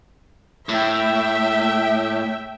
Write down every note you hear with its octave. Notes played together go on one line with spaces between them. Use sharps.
A2 E5 G5